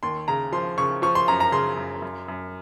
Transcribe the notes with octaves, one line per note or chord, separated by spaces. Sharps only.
D#2 C6
C#3 A#5
F3 C6
C#3 C#6
F3 C#6
C6
F#2 A#5
A#5
C#3 C6
F#2
F#2
F#2